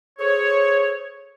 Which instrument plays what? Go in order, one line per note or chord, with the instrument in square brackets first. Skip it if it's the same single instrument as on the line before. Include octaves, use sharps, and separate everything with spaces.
[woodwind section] G#4 A4 C5 C#5